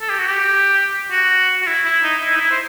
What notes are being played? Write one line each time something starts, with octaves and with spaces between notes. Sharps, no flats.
A4
G4
F#4
G4
F#4
F#4
E4
E4
D#4
E4
D#4
E4
C5